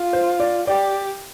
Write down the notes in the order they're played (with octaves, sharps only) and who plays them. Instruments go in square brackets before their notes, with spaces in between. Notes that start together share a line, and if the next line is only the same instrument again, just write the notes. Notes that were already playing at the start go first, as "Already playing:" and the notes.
Already playing: [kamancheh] F4
[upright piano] C5
D5
[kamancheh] G4 [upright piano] D5 G5